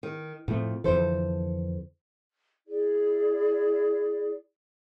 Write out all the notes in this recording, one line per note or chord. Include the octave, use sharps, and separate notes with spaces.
D#3
F2 A2 A3
F2 D3 E3 A4 C5
E4 G#4 D5